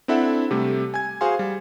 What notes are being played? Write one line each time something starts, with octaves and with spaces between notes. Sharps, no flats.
C4 D4 E4 A4 E5 F#5
C3 G3 A3
G#5 G#6
F#4 G#4 C5 F5 G#5 C6
G3